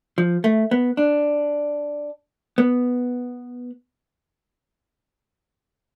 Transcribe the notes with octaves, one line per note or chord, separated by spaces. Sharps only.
F3
A3
B3
D4
B3